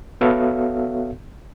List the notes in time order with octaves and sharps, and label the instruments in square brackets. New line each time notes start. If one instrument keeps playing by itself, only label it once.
[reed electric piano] B3 F#4 A4 C#5 E5 F5